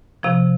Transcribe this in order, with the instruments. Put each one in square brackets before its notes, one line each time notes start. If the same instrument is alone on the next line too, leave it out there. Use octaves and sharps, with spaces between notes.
[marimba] C3 F3 F5